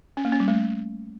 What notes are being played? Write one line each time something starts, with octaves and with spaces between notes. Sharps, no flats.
C#4
A#3
C#4
G3
A3